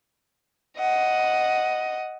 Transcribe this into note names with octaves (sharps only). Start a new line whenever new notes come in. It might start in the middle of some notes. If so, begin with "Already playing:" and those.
D#5 F#5